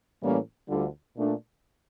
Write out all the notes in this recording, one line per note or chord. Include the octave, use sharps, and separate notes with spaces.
A2 E3 G3 A#3 C#4
D2 D3 G3 D4 F4
A#2 A3 D4